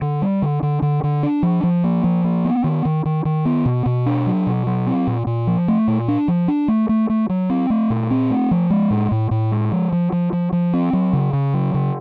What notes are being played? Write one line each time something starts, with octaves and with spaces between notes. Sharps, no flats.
D3
G3
D3
D3
D3
D3
D4
F3
F3
A#3
F3
A#3
B3
D#3
D#3
D#3
D#3
B3
B2
B2
D4
F#3
B2
F#3
C4
A#2
A#2
F3
A3
A#2
D4
F3
D4
A3
A3
A3
F#3
C4
A3
A#2
C4
A3
F3
G#3
A2
A2
A2
G#3
F3
F3
F3
F3
F3
C4
F#3
C#3
C#3
F#3
C#3